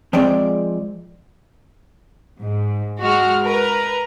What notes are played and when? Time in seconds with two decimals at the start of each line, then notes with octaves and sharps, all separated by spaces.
0.13 F3 G#3 C4 G#4 D5
2.38 G#2
2.99 G#3 F#4 F6
3.42 A#4 B4 A#5